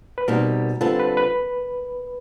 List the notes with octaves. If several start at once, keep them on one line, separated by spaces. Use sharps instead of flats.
B4
B2 G3 C4 D#4 A#4
D3 G3 C4 F4 A4 B4
B4
B4